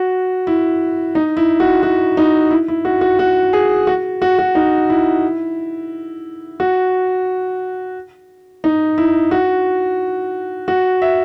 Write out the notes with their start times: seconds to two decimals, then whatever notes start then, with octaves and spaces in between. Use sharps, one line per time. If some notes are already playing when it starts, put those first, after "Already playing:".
Already playing: F#4
0.47 E4
1.15 D#4
1.37 E4
1.60 F#4
1.83 F#4
2.17 D#4
2.51 E4
2.68 E4
2.85 F#4
3.01 F#4
3.19 F#4
3.53 G#4
3.87 F#4
4.22 F#4
4.38 F#4
4.55 D#4
4.90 E4
6.60 F#4
8.64 D#4
8.98 E4
9.31 F#4
10.68 F#4
11.02 E5